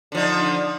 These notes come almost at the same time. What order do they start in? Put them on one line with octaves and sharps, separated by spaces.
D3 F3 D#4